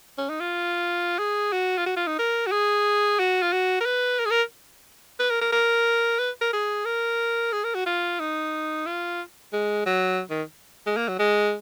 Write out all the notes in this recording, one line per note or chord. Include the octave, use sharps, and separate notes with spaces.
C#4
D#4
F4
G#4
F#4
F4
F#4
F4
D#4
A#4
F#4
G#4
F#4
F4
F#4
A#4
B4
A#4
G#4
A#4
B4
A#4
A#4
A#4
B4
A#4
G#4
A#4
G#4
A#4
F#4
F4
D#4
F4
G#3
F#3
D#3
G#3
A#3
F#3
G#3